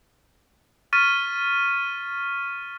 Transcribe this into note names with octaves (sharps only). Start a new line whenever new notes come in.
C#6 F6 A6 B6 D#7